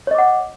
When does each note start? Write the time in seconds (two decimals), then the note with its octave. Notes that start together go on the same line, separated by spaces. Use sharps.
0.07 C#5
0.11 D#5
0.15 D6
0.18 F#5